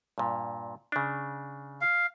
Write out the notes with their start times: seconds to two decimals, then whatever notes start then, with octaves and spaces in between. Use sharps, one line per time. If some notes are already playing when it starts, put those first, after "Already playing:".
0.18 G2 A#2
0.92 C#3 D4
1.81 F5